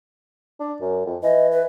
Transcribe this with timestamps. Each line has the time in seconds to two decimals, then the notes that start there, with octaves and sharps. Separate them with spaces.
0.60 D4
0.81 F#2
1.05 F2
1.23 E3 D#5
1.51 B4